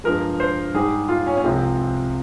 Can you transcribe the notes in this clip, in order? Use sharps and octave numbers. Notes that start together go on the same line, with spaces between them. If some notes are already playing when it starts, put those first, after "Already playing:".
G2 F3 G#3 A#4
C5
G#2 G3 G#4
F4
C#4
C#4
C2 C3 F3 G#3 C4